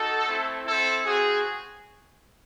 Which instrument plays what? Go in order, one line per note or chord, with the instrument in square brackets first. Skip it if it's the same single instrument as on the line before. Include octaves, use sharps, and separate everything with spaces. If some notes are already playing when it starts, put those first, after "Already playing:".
Already playing: [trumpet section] D#4 F#4 A4
A3 C4 E4
C4 E4 A4
C4 F#4 G#4